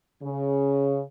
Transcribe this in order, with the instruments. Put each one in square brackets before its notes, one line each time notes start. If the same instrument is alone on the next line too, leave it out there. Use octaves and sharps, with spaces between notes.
[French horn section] C#3